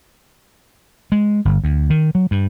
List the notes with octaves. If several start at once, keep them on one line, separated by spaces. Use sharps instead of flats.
G#3
G1
D2
D#3
F#3
G2